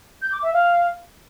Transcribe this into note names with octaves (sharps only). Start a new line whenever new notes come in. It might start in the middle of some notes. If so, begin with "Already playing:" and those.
G6
D6
E5
F5